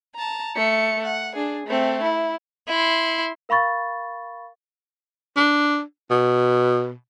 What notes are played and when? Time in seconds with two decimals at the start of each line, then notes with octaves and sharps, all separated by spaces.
0.15 A5 A#5
0.56 A3 C#7
1.04 F#5
1.35 D4 G#4
1.67 A3 C4
2.03 E4
2.68 E4 C6
3.49 A#4 F5 B5 C#6 A6
5.36 D4
6.10 B2